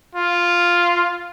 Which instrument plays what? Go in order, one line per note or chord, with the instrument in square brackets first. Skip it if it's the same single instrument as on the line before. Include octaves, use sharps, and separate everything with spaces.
[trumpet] F4